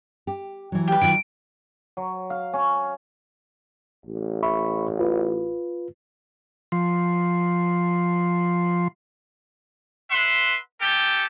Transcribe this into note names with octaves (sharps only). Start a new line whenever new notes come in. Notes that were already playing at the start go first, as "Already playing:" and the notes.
G4
E3 F#3
G4 B4
D#3 F#3 F4 D7
F#3
F5
C#4
A1
E5 B5 C#6
F4 B4
F3 C6
B4 E5 F#5 C6
C#4 G4 A4 G5